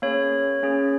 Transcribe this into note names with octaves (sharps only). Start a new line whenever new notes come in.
A#3 C#4 G#4 C#5
A#3 C#4 G#4